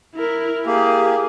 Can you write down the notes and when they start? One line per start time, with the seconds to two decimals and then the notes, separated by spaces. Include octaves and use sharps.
0.15 E4 A#4
0.66 A#3 G4 G#4